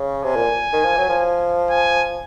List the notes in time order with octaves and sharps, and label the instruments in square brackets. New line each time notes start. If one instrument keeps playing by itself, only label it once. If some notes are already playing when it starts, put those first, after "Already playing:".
Already playing: [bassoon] C#3
[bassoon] C3 [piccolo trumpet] G#5
[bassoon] A#2
D#3
F3
F#3
F3
[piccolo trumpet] G#5